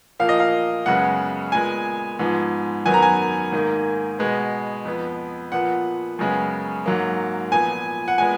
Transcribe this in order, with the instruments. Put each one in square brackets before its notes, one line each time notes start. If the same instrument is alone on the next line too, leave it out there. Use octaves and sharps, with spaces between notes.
[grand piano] A#2 F3 A#3 F5
D#5
F5
F#2 C#3 G#3 B3 F#5
A#2 G#3 B3 G#5
G#2 F3 B3
F#2 D#3 F#3 B3 G#5
A#5
G#5
G#2 D#3 A#3
B2 G#3 B3
F2 F3 B3
A#2 F3 B3 F#5
F#2 C#3 G#3 B3
G#2 F#3 A#3
A#2 F3 B3 G#5
F#5
A#2 G#3 B3 G#5